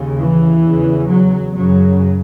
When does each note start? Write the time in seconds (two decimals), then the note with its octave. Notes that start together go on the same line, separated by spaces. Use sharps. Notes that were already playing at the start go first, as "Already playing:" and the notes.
Already playing: D#2 C#3
0.18 E3
0.64 E2 C#3
1.09 F#3
1.54 F#2 C#3 F#3